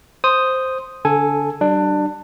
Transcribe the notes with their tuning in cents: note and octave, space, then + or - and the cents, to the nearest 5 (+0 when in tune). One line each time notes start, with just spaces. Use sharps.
C5 +0 D#6 +0
D3 -35 A4 +0 G#5 +0
G3 -35 D4 +20